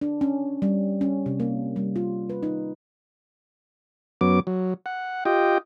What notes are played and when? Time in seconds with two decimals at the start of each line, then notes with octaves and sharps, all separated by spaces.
0.01 D4
0.21 C#4
0.62 G3
1.01 C#4
1.26 C3
1.40 A#3
1.76 G3
1.96 F4
2.30 B4
2.43 D#4
4.21 F#2 F#3 B3 D6
4.47 F#3
4.86 F#5
5.25 F4 G4 D#5 G5